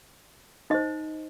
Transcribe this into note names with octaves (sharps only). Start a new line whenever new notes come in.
D#4 C5 D#5